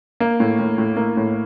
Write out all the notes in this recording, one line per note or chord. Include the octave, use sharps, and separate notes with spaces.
A#3
A2
A2
A2
A#3
A2